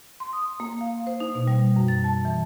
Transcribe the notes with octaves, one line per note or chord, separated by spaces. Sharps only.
C6
D#6
A#3
F5
C5
D#4
B2
G3
F#2
A6
A5
E3